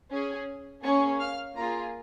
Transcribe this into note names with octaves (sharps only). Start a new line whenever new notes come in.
C#4 G#4
A#3 C#4 G#4 C#5 C#6
F5 F6
A#3 F4 G#4 A#4 A#5